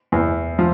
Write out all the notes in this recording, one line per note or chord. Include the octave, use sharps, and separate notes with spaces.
E2
F3